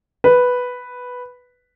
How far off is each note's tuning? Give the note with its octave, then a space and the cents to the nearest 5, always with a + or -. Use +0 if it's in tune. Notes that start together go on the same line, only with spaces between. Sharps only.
B4 +0